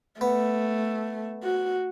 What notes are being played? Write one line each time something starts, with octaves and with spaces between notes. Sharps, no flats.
A3 B3
F#4